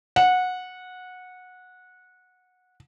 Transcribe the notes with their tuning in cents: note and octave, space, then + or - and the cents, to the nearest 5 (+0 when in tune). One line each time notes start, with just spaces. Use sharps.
F#5 -15